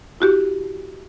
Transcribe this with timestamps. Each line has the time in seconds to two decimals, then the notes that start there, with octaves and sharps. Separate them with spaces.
0.20 E4 F#4 G4